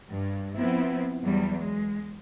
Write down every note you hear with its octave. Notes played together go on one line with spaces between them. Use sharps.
G2
F3 B3 C4 E4
E2 F#3 G3
G#3